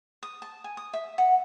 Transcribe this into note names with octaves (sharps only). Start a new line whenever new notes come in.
D#6
A5
G#5
D#6
E5
F#5